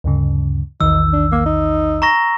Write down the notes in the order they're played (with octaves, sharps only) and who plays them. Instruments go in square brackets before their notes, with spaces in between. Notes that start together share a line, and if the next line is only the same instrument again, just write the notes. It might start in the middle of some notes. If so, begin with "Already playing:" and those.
[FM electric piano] D2 G2 C#3
[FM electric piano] A#1 E2 D#3 [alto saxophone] D#4 [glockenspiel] E6
[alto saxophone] D4
A#3
D#4
[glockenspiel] A#5 C#6 A#6